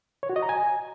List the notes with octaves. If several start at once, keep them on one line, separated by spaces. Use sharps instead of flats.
C#5
F#4
D#5
A#5
G#5